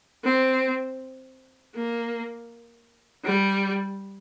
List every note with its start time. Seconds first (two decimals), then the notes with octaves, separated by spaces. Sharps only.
0.24 C4
1.75 A#3
3.25 G3